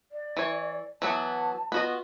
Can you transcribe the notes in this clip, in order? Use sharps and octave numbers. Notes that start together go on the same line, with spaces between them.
D5
E3 C#5
E3 F#3 B3 A5
B3 F4 F#4 D#5